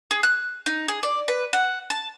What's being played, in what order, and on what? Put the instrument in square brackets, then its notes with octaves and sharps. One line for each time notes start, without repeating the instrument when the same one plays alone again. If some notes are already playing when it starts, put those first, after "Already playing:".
[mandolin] G#4
F#6
D#4
G#4
D5
B4
F#5
A5